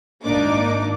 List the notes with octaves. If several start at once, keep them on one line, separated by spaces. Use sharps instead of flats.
G#1 A#3 D4 D#4 D6